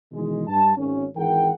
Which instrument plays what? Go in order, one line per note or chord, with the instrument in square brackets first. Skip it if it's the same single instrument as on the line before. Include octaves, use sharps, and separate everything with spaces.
[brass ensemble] B2 D#3 E3 G#3
G2 A5
G#1 C#4
G#1 E3 G#4 A#4 F#5 G5